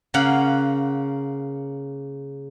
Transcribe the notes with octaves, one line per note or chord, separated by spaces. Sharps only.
C#3 A#3 F5 F#5